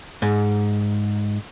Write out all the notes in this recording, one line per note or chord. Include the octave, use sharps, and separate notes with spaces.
G#2